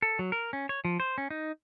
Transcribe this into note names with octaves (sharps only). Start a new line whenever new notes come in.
A4
F#3
A#4
C#4
C#5
F3
C5
C#4
D#4